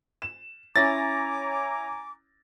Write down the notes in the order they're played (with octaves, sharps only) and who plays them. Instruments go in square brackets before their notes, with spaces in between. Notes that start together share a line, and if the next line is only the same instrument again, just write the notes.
[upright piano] E7
[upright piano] C#4 E4 C#5 [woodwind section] G#5 A#5 D6 [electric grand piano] A6 A#6